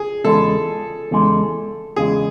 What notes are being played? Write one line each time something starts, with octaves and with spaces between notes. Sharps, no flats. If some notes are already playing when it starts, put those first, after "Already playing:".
Already playing: G#4
E2 C#3 G#3 A4
E2 C#3 G#3
E2 C#3 G#3 G#4